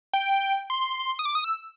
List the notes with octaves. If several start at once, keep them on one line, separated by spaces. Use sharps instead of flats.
G5
C6
D#6
D6
D#6
E6